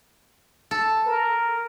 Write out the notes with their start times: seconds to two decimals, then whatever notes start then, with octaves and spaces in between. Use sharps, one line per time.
0.71 A4
1.06 A#4